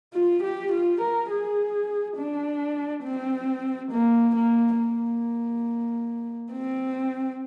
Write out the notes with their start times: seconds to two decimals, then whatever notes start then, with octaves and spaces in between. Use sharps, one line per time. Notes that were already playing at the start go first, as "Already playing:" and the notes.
0.13 F4
0.43 G4
0.72 F4
1.01 A#4
1.30 G#4
2.16 D4
3.04 C4
3.91 A#3
4.35 A#3
4.79 A#3
6.53 C4